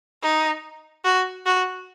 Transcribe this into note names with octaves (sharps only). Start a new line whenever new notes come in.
D#4
F#4
F#4